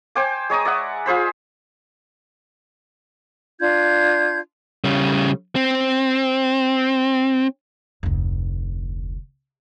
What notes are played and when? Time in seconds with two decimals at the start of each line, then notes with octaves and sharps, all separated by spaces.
0.15 C5 G5 G#5 D6
0.50 G#3 C#5 A#5 D#6
0.65 D5 E5 F#5
1.06 F4 G#4 C5 B5
3.60 D4 F4 G6 G#6
4.84 C#3 G3
5.56 C4
8.03 F1 D2